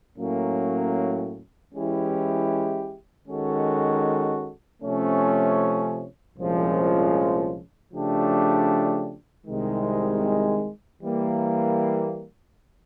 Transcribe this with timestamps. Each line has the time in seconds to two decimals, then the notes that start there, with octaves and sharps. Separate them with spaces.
0.18 A2 F#3 A#3 C#4
1.73 E3 G#3 C#4 E4 G4
3.28 D#3 G#3 C#4 F#4 A4
4.82 C3 F3 A3 C#4
6.37 C2 A#2 F3 G#3 C#4
7.92 C#3 F3 A3 D4 G4
9.46 C2 C3 D#3 G#3
11.02 E3 G3 A#3